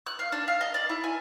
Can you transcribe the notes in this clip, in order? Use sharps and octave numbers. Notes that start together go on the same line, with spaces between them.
F#6
F5
D4
F5
D#5
D5
E4
G#5